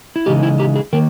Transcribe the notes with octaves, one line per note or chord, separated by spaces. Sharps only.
E4
C#3 E3 G#3 D#4 G4
E4
G4
G#4
D#3 A#3 A#4